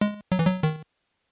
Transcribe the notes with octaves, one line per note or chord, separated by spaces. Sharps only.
G#3
F#3
E3
F#3
D#3